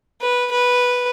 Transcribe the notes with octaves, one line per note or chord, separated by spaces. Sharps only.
B4
B4